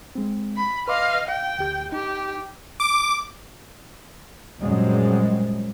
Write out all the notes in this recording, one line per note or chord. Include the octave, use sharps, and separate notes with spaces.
G#3 C4
B5
B4 D#5 F5 C6 D6
F5 G5
D2 G4 G6
D#4 G4
D6
F#2 A#2 G3 G#3 C4